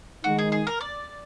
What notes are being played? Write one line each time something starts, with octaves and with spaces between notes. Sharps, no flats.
D#3 G#3 D#4 F#4
G#4
G#4
A#4
D5